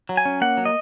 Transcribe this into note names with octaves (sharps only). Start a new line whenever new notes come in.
F#3
G#5
C#4
A#3 F#5
F#3
D#5